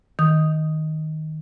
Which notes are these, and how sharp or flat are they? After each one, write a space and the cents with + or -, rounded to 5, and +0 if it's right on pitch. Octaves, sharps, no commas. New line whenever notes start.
D#3 +0 D#6 +0